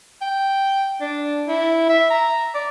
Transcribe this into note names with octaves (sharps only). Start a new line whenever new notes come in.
G5
D4
E4
E5
A#5
D5